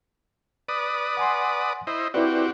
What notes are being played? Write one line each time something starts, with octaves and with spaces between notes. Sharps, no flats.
B4 D5 D#6
F#5 G#5 C6
E4 C5 D#5
C4 E4 F#4 G4 B4 D5